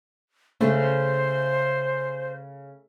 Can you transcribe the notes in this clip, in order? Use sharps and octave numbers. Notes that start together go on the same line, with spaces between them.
C#3 A3 C5